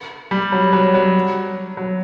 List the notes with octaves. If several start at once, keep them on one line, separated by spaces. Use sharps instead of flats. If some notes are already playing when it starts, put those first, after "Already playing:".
G3
F#3
F#3
F#3
F#3